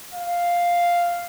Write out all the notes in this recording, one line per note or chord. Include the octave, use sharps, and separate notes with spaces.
F5